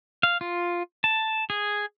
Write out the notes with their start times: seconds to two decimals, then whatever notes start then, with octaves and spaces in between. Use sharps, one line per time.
0.23 F5
0.41 F4
1.04 A5
1.50 G#4